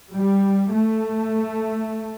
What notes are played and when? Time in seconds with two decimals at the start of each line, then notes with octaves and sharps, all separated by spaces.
0.14 G3
0.73 A3